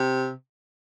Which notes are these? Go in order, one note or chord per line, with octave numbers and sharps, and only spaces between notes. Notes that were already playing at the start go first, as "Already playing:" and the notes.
Already playing: C3